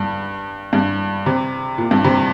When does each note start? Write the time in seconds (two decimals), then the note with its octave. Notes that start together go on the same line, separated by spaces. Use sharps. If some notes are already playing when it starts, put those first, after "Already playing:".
Already playing: G2
0.73 G2
1.26 C3
1.78 A#2
1.91 G2
2.04 C3